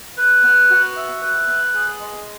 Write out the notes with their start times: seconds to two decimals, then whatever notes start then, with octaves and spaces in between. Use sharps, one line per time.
0.17 B4
0.43 B3
0.70 F#4
0.96 E5
1.22 B4
1.47 B3
1.74 G#4
1.99 G#3